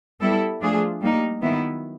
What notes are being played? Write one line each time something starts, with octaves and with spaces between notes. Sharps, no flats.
G3 B3 E4 A4
F3 A3 D4 F4 G#4
G3 A#3 D#4
D#3 F#3 B3 E4